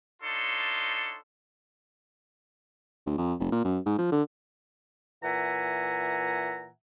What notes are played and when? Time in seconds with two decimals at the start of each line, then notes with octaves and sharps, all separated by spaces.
0.22 D4 D#4 F4 A4 C#5 C6
3.07 D2
3.18 F2
3.39 F1
3.52 A#2
3.65 F#2
3.86 G#2
3.98 F3
4.12 D3
5.24 A#2 E3 E5 F#5 G#5 A#5